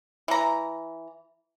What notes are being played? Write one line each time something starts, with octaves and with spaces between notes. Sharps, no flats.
E3 A#5